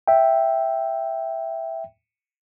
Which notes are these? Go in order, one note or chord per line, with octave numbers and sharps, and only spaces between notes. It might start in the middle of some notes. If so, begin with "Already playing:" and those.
E5 G5